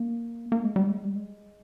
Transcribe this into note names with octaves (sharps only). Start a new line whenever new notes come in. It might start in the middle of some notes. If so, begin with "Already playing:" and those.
Already playing: A#3
A#3
G#3
G3
G#3
G3
G#3